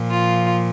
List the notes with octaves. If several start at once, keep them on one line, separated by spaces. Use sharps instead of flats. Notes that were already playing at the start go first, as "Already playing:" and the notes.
Already playing: A#2 F3
F4